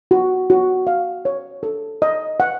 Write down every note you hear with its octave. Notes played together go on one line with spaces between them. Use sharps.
F#4
F#4
F5
C#5
A4
D#5
F#5